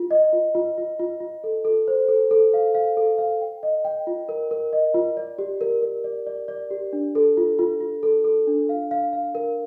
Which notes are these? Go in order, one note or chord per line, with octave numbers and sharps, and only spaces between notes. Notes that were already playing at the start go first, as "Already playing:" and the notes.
Already playing: F4
D#5
F4
F4
F4
F4
F4
A4
A4
C5
A4
A4
F5
F5
A4
F5
G5
D#5
G5
F4
A#4
A#4
D#5
F4
D5
G4
A#4
A#4
D5
D5
D5
G4
D4
A4
F4
F4
F4
A4
A4
D4
F5
F5
F5
A#4